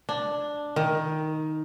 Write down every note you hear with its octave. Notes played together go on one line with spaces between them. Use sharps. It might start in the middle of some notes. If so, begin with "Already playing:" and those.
D4
D#3